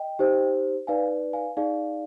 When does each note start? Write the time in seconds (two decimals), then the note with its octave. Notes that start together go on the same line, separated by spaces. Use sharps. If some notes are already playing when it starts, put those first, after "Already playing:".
Already playing: D#5 G5
0.19 D#4 G4 C5
0.87 D#4 B4 D5 F5 G#5
1.33 F5 G#5
1.57 D#4 G#4 D5 F5